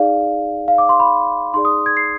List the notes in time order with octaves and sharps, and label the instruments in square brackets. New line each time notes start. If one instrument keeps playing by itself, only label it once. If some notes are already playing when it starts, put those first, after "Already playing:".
Already playing: [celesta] D#4 G#4 D5 F5
F5
D6
C6
B5
D#4 G#4 D5 C6
D#6
G#6
C7